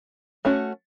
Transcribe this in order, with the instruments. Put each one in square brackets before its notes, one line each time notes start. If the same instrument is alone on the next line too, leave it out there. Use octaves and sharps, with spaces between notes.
[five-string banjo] A3 C#4 F#4